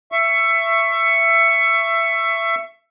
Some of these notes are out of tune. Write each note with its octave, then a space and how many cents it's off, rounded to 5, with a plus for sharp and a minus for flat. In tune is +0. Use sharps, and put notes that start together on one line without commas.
E5 +20 C#6 +0